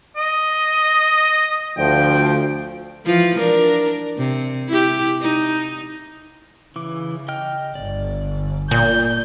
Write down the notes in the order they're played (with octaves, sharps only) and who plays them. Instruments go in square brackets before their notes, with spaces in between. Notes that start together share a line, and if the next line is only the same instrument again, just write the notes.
[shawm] D#5
[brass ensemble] D2 F3 [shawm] G5
[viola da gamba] E3 F3 F4
D4 A#4
C3
E4 G4
D#4
[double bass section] C#3 [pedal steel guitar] E3 D6
[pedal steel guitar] D#5 G5 F6
[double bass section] G1 [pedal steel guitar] D5
[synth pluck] A#2 [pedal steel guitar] D5 G#5 [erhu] G6